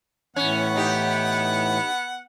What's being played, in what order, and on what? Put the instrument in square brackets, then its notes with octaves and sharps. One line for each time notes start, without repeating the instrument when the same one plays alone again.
[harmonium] A2 E3 [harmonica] B3 F#5 [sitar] C#4
[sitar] D#4 G4